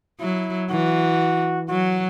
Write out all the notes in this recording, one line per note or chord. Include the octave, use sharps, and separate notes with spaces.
F#3 E4
E3 F#4
F#3 F#4